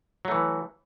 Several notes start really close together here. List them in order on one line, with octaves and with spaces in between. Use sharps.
F#3 A3 E3